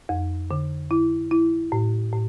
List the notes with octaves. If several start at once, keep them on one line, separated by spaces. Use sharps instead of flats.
F2
D3
E4
E4
A2
A2